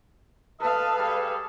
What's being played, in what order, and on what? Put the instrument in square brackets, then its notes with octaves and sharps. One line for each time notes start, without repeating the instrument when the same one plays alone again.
[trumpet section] A4 D#5 A5 [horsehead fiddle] B4 F5
[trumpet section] G3 G#4 A4